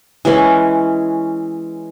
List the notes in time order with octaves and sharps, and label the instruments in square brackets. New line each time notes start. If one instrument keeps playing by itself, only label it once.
[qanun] E3 G#3 C#4